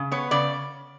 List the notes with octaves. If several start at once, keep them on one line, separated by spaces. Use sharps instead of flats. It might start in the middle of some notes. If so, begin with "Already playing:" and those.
Already playing: C#3
B3 C#5
C#3 D5